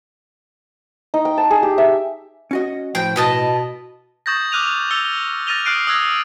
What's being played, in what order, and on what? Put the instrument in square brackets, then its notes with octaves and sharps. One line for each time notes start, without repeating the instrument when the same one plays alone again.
[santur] D#4
G5
A5
G#4
G4
E5
[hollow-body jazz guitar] C#4 F#4 D#5
[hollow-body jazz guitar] A2 [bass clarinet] F3 [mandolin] G5
[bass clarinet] B2 [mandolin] B4 D#5 A5
[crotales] C#6 D#6 G6 A6 A#6
D6 F6 F#6 D#7 F7
E6 A6 C#7 G7
F6 A6 A#6 D#7 F7 G7
D#6 F6 F#6 C7 D7 D#7
D#6 E6 F#6 G#6 A#6